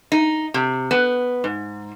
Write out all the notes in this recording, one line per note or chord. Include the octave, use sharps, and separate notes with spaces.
D#4
C3
B3
G#2